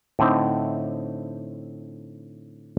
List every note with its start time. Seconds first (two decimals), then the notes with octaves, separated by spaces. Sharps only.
0.19 A2 D3 C4 D#4